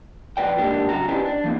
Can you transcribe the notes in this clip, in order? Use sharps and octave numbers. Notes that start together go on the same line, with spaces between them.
F2 F3 G#3 B4 D5 G5
G#2 A#3 D4 G4
F#2 C#3 F#4 A#5
C#4 D4 E4 G4 B4 C5
D4
E3 A#3 C4